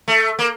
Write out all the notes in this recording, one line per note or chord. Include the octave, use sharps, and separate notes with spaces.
A3
A#3